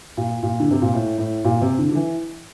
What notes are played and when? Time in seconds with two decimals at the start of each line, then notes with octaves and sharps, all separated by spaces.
0.17 A#2
0.43 A#2
0.60 D3
0.71 C3
0.82 A#2
0.94 A2
1.18 A2
1.45 A#2
1.61 C3
1.79 D3
1.89 D3
1.95 E3